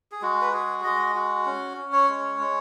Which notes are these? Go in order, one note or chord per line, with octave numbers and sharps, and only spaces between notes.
G#4
G#3 F#4
B4
F#4 G#4
G#3 D#5
F#4
C#4
C#4
C#5
G#3
G#3